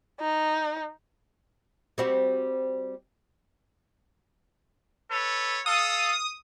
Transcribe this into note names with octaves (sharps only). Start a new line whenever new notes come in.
D#4
G3 C4 F#4
A4 B4 C#5
A4 F5 D#6